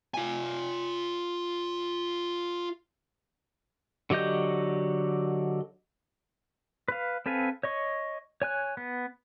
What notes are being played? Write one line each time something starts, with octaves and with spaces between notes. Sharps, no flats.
F4 G#5
D3 F#3 G4 D#5 G6
B4 F5
C4 A4 B4 F5 G#5
C#5 D#5 C#6
C#5 G#5 F#6
B3